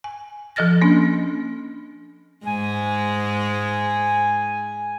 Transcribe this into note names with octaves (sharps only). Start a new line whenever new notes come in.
G#5
F3 A4 D#5 F6 A6 A#6
A#3 C#4 D4
G#2 G#3 G#5